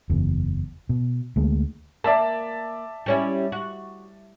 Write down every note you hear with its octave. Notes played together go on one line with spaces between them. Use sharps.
F#1 E2
B2
D2 G#3 A#3
A#3 D5 E5 A5
G3 C#4 E4
F#4